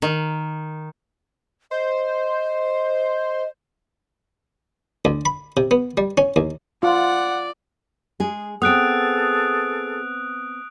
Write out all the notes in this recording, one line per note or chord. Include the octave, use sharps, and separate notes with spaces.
D#3
C5 D#5
D2
B5
C3
B3
G3
C#4
D#2
F4 D5 F#5
G#3 G#4
B3 C4 G#4 A4 D#6 F#6 D7